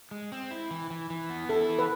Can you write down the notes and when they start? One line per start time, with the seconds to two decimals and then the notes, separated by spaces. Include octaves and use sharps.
0.11 G#3
0.32 C4
0.51 E4
0.71 E3
0.90 E3
1.10 E3
1.30 B3
1.49 E4 A4
1.69 E3
1.79 B4